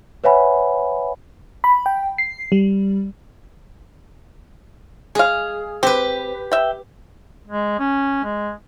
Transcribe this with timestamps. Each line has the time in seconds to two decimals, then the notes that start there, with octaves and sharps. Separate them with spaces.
0.24 B4 C#5 E5 F#5 G#5 B5
1.64 B5
1.86 G5
2.18 C7
2.52 G3
5.15 G#3 G#4 F5
5.83 C4 G4 B4
6.52 E5 G5
7.48 G#3
7.79 C#4
8.24 G#3